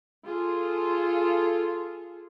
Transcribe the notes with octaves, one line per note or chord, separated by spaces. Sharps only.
F4 G#4 A4